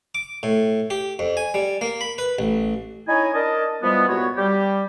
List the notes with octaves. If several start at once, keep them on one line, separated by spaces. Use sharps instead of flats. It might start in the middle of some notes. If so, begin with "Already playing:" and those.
D6
A2
G4
F2
G#5
G3
A#3
B5
B4
A1
C#4 D#4 E4 C#5 D#5 G#5
D4 A#4 D#5 A5
E3 F3 G3 G#3 B3
C2 A#2 B3 F#4 B4 C#5
G3 G4